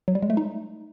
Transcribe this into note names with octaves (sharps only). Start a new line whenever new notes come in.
F#3
G3
G#3
A3
D#4